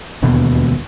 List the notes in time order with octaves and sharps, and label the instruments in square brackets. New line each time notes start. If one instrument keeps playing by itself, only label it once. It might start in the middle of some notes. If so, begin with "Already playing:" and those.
[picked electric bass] E1 D#2 B2 D3